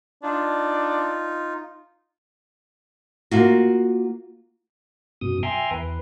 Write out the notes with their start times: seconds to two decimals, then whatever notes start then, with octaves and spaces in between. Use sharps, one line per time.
0.23 D4 D#4 F4
3.31 A#3 F4 F#4
5.21 F#2 B2 D#6
5.43 E5 G5 G#5 A#5 C6
5.71 E2 B4